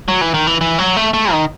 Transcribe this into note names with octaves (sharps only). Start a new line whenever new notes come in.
F#3
E3
D#3
E3
E3
F#3
A3
A3
D#3